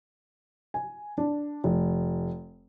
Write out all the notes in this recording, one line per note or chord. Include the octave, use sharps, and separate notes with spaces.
G#5
D4
F1